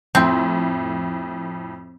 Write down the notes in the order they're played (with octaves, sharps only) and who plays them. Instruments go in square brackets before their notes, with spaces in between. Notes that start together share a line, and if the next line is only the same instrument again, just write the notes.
[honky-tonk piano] F2 A2 [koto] C4